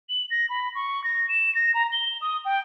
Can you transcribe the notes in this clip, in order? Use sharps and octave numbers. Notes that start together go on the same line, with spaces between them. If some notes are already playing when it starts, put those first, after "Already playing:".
F#7
A#6
B5
C#6
A#6
E7
A#6
A#5
G7
D#6
G5